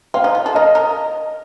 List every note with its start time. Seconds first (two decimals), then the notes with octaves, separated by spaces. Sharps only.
0.14 C4 F5
0.24 D#4
0.35 F4
0.46 A4
0.55 A#4 D#5
0.75 A#4